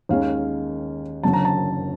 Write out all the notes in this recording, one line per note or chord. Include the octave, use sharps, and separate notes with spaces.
D#2 D#3 G#3 C#4 F5
F#1 F#2 D3 F#3 A5
A#5
A5